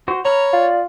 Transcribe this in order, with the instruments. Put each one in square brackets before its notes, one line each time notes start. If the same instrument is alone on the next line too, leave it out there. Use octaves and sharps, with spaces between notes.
[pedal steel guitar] F#4 C5
[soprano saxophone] C#5 [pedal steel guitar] A#5 B5 F6
[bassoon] F4 [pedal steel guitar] D5